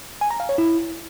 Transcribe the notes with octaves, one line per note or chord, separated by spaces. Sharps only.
G#5
A#5
F5
C#5
E4